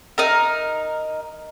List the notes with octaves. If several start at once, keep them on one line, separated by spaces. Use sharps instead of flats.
D#4 A#4